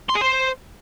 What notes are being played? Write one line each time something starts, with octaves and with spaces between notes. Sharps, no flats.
C6
G#4
C5